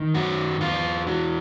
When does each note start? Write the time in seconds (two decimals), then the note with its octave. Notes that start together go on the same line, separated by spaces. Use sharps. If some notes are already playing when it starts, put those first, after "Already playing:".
Already playing: D#3
0.14 F#2 F#4
0.60 E2 F4
1.06 E3 F#4